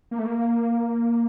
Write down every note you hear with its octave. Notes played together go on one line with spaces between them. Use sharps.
A#3
A3
A#3